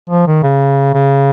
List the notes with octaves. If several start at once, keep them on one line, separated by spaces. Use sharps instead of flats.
F3
D#3
C#3
C#3